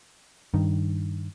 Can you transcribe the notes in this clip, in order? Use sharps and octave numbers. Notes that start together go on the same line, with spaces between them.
G2 D#3